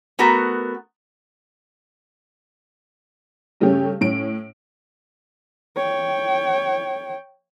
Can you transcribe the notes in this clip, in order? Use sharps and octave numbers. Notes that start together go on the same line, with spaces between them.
A3 B3 F#4 A#4
G2 C#3 A3 C#4 G4
A2 C#4 D7
C#5 G5